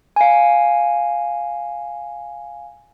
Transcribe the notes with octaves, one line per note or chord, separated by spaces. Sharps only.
F5 G#5